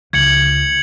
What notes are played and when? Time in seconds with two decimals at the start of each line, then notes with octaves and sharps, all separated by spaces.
0.13 C#2 G#6 C#7 F#7